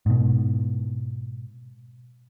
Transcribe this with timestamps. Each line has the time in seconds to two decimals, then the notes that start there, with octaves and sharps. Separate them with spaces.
0.06 G#2 B2